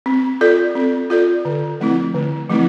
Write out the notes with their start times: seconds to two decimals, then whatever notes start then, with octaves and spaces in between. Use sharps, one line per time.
0.06 C4
0.41 F4 A4 D5
0.75 C4
1.10 F4 A4 D5
1.45 D3
1.80 F3 A3 C4 E4
2.15 D3
2.50 F3 A3 C4 E4